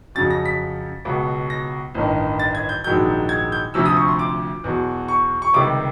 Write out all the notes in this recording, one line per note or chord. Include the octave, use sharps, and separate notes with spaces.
F2 C#3 F#3 A6
A#6
B6
C#2 B2 F#3
A#6
A1 G2 D#3
A6
G#6
G6
A#1 G#2 D#3 F#3 G6
G#6
G6
D2 C3 F3 E6
D#6
C#6
C6
D6
E2 B2 F#3
C#6
C#6
C#2 C3 D#3 G3 D6